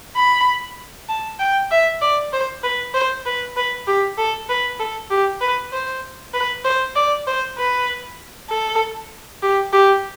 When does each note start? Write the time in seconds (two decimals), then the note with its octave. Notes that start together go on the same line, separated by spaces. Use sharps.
0.16 B5
1.09 A5
1.40 G5
1.71 E5
2.02 D5
2.33 C5
2.64 B4
2.94 C5
3.26 B4
3.57 B4
3.87 G4
4.18 A4
4.49 B4
4.80 A4
5.11 G4
5.41 B4
5.73 C5
6.34 B4
6.65 C5
6.96 D5
7.27 C5
7.58 B4
8.50 A4
9.43 G4
9.73 G4